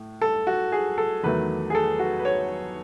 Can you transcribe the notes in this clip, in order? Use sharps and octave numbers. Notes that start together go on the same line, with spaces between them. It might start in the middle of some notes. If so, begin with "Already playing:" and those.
Already playing: A2
A4
F#4
G#4
A4
E2 D#3 F#3 A3 B4
G#4
A4
F#4
B4
C#5